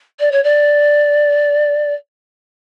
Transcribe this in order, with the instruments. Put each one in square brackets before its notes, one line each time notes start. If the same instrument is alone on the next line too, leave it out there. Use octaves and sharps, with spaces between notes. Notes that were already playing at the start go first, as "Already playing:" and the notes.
[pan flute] D5
C#5
D5